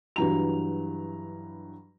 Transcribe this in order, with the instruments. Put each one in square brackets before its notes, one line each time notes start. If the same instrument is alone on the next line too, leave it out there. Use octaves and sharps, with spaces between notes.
[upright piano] G2 E3 F#3 A#5 F7